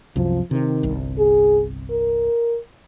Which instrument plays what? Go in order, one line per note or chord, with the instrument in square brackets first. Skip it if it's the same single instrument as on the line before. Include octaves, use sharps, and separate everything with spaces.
[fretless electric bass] C2 F#2 C3 [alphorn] F3
[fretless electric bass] C3 [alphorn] D#3
[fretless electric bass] G1 C2
[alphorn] G#4
A#4